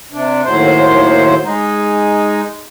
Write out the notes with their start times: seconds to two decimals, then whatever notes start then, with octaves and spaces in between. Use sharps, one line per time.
0.13 C3 D4
0.45 D#2 A2 F#3 C5
1.44 G#3 D#4